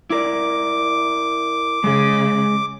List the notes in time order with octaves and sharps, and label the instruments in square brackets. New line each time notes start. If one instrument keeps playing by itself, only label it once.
[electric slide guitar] E4 A#4 D5 [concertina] D6
[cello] C#3 [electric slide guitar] G#3 G#4